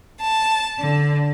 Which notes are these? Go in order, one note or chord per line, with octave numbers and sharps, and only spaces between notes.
A5
D3